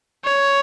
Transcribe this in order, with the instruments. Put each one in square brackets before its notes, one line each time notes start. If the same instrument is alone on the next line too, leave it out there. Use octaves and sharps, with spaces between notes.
[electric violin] C#5